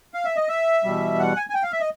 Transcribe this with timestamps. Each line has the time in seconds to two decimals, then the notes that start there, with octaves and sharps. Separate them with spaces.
0.14 F5
0.25 E5
0.36 D#5
0.49 E5
0.84 E2 B2 G3
1.20 F#5
1.36 G#5
1.50 G#5
1.54 G5
1.63 F5
1.72 E5
1.80 D#5